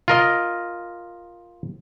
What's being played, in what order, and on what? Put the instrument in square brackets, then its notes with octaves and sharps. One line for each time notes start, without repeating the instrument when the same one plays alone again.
[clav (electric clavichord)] F4 A#4 D#5